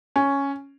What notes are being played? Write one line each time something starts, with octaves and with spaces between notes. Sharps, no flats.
C#4